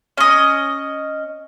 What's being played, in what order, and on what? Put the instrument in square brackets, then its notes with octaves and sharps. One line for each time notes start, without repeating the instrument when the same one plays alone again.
[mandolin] C#4 D#5